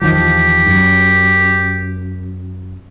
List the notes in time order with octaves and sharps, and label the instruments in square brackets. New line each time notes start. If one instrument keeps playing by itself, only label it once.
[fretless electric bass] E2 D#3 F3 [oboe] G4
[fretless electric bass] F#2